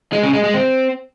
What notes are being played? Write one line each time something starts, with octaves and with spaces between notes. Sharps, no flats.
G#3
C#3
G#3
G#3
C4